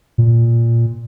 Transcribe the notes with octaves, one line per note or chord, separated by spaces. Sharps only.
A#2